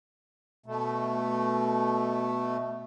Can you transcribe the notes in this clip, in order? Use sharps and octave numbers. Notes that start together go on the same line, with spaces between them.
B2 A3